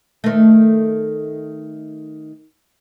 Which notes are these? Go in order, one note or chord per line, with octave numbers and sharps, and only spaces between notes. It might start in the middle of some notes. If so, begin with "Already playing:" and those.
D#3 A3